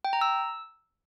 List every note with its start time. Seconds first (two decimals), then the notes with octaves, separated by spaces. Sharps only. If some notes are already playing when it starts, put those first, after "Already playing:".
0.05 G5
0.13 A#5
0.21 E6